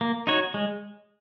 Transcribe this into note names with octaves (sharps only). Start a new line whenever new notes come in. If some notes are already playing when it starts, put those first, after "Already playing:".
A#3
D#4 F#4 C#5
G#3